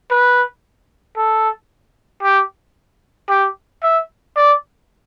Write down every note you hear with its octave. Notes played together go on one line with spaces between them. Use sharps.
B4
A4
G4
G4
E5
D5